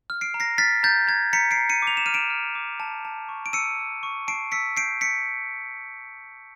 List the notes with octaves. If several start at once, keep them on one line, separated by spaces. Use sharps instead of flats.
F6
C7 D7
A#5
A#6 C7
F6 A6 B6
A#5 G6 A6
A#5 G#6
A#5 B6 C#7
C7 D7
A#5
C#7 D#7
D6 F7
E7
F6 D#7
D7 E7
F6
D6
A5
A5
C#6
D7
E6 C#7 D#7
E6
C#6
A5 C7 D7
E6 B6 C#7
G6 C7 D7
E6 B6 C#7